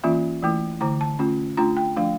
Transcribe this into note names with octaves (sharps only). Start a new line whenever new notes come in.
E3 A#3 C#4 F4 E5
E3 A3 E4
D3 A3 E4 A#5
A5
A3 C#4 F4
A3 D4 F4 A#5
G5
F3 A3 D4 F5